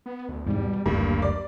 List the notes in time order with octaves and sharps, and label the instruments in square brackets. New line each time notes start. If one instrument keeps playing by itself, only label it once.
[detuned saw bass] B3
D2
[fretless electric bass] E2 G#2 C3 [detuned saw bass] G3
[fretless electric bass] B2
[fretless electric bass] F#1 D2 [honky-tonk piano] G2 [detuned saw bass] A#3
[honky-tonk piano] D5